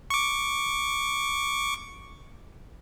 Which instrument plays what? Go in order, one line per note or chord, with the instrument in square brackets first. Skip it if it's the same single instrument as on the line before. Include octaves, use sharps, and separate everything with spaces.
[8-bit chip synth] C#6 D6